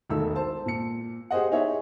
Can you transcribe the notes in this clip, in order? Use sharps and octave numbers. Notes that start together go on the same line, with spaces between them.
E1 B1 D#3 A3 A4 E6
C5 A5
A#2 C#7
G4 G#4 C5 D#5 F#5
D#4 E4 G#4 C#5 E5